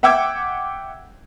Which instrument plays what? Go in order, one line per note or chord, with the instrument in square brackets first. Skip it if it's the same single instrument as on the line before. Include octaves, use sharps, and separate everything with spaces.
[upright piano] E5 F#5 G5 D6 E6 G#6